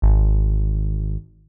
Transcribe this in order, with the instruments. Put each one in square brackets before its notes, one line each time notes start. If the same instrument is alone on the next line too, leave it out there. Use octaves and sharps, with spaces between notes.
[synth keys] G#1